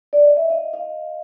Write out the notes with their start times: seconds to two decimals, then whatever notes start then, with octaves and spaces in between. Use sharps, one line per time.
0.13 D5
0.25 D#5
0.37 E5
0.50 D#5 F5
0.73 D#5 F5